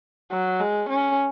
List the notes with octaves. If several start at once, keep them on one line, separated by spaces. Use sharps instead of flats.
F#3
G#3
C#4